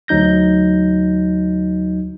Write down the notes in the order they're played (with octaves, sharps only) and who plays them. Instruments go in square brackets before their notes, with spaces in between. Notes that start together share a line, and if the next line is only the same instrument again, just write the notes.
[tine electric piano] D2 F#3 D#4 G6 A#6